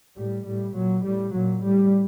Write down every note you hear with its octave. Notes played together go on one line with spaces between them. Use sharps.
A2 G3
A2 G3
A#2 F#3
A2 G3
A#2 F#3
A2 G3